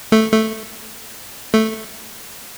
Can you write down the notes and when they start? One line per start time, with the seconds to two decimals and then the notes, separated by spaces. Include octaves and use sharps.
0.12 A3
0.32 A3
1.53 A3